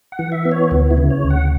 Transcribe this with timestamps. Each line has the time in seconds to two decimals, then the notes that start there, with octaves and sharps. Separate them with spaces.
0.12 F#5
0.19 E3
0.32 E5
0.45 B3
0.51 C#5
0.71 D2
0.91 E4
0.97 C#3
1.10 C#5
1.24 D2
1.30 F#5